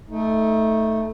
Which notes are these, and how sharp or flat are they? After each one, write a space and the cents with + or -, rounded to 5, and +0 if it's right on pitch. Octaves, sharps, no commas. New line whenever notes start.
A3 +0 D#4 +20